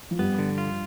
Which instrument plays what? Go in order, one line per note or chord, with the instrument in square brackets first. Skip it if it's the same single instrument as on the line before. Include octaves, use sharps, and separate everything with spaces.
[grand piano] F3
[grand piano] G2 G3 [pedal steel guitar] B3
[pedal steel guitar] D3
F4